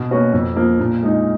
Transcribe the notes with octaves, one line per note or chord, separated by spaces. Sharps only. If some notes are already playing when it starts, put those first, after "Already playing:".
Already playing: B2
A#3 C#4 F#4 B4
F2
F3 A#3
A#2
G#3 D#4